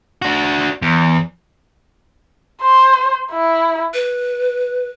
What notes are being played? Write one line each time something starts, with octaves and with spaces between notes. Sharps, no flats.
D4 F#4
E2
C5
E4
B4